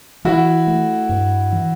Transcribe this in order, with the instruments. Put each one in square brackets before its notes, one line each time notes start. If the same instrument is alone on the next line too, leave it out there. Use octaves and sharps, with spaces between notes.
[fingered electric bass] E3 [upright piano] E4 F#4
[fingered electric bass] A3
G2
E3